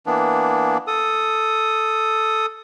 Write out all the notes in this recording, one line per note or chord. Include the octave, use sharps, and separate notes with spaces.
E3 A#3 B3 D4
A4 D#6